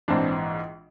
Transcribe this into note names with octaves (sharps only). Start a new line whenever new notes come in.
A#1 G#2 E3 C4 D4